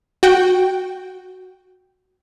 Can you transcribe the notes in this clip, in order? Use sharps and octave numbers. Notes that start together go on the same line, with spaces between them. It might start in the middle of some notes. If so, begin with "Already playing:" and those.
F#4 G5